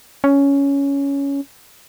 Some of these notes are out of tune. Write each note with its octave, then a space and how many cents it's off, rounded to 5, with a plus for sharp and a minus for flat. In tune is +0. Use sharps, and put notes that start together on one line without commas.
C#4 +10